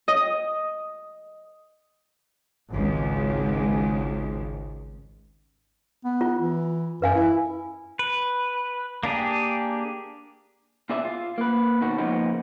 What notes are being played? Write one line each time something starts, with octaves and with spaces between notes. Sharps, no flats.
D#5
G#1 C#2
B3
F4
E3
F#2 B4 F5 G#5
E4
B4
A#3 D4 G4 G#4
B2 F4 G#4 D5 E5
F4
A#3 B4
B2 D#3 F#4
C#3 F3 G#3 A#3 B3 D#4